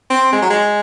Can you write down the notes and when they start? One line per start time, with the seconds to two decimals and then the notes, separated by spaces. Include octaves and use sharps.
0.10 C4
0.32 G#3
0.42 F#3
0.50 G#3